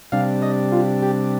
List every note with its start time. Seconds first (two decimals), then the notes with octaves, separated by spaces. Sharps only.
0.12 C3 G3 D4 F5
0.42 D#5
0.72 F4
1.02 G4